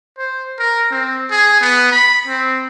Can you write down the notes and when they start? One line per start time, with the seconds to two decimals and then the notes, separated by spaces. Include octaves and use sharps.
0.18 C5
0.59 A#4
0.91 C4
1.31 G#4
1.61 B3
1.92 B5
2.27 C4